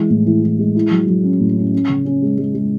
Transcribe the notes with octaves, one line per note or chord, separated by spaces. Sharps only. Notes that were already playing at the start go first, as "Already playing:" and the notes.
Already playing: E3 G#3
A2
E3
E3
G#3
E4
F#3
F#3
C#4
A2
C#4
C#4
C#3
C#4
G#3
G#3
G#3